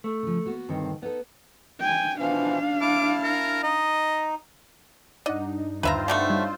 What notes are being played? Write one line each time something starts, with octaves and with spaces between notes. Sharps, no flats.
A3
C#3 F3
A#3 B3 F#4
D2 G2 D#3 C4
B3 D#4 A4
G5 G#5
B2 E3 F3 D4 F5
E4 A5 D6 F6
A#4
D#4 D#5
G2 D4 D#4 D5 D#5 F#5
D#2 D3 C4 F4 B4 C5 E5 A#5
B2 D3 A3 G6
G3 C#5